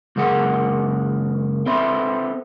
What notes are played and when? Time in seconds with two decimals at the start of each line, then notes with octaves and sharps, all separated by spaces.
0.16 C#2 F#2 A#3 G#4 F#5
1.66 C4 A4 B4 C5 E5